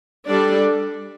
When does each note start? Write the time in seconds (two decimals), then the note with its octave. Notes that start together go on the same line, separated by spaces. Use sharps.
0.28 G3 D4 A4 D5